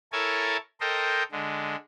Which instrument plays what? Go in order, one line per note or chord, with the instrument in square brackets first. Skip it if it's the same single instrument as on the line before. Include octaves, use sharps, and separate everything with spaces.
[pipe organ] E4 A4 A#4 C#5 G#5 A5
A4 A#4 C5 D#5 G5
D3 G#3